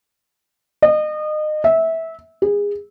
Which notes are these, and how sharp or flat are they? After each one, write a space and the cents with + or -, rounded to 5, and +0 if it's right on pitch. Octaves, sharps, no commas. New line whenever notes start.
D#5 -30
E5 -20
G#4 -25